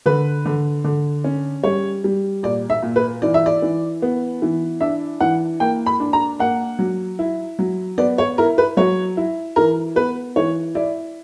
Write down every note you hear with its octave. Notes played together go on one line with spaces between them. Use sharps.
D3 B4
D3
D3
C#4
G3 C#5
G3
A#2 D5
E5
A#2
B4
E3 D5
E5
D5
E3
B3
E3
D4 E5
E3 F#5
A#3 G5
B5
D4
A#5
A#3 F#5
F#3
E4
F#3
B3 D5
C#5
E4 A#4
B4
F#3 C#5
E4
E3 A#4
B3 B4
E3 C#5
E4 D5